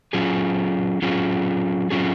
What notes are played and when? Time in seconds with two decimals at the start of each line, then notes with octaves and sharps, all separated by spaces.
0.13 F#3 C#4 F4 G#4
1.02 F#3 C#4 F4 G#4
1.90 F#3 C#4 F4 G#4